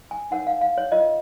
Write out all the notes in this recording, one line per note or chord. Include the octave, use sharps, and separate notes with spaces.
G#5
D#4 A#4 C#5 F#5
F5
F5
C#5
F4 A#4 C#5 D#5